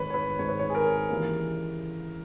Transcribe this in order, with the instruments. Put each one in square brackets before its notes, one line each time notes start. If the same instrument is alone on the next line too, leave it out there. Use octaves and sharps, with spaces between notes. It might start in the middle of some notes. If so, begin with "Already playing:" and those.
Already playing: [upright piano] G#1 G#2 D#3 B4 C#5
C#5
B4
G#1 G#2 D#3 C#5
B4
C#5
G#4
A#4
D#2 C#3 E3